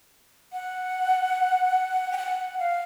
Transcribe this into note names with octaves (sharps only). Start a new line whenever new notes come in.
F#5
G5
F#5
F5